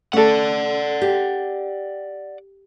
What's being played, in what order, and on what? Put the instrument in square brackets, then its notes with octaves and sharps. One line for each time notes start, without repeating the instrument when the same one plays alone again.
[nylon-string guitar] A3 [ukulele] C#4 A4 [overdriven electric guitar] D5 F#5
[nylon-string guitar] G4